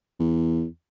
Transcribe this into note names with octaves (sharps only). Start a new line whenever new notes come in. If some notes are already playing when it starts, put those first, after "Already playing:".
E2